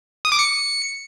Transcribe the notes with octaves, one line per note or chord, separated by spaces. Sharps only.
D#6
D6
C#7